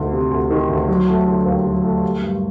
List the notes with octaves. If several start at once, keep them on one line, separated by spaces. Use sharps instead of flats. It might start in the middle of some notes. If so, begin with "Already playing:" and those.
Already playing: D2 D#3
C3
D2
D#3
D2
F#3
A3
D3
D#2
F#3
A3
G3
G2